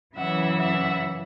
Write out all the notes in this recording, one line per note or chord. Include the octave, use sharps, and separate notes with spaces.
F#2 C#3 E3 E5 F#5
E5 F#5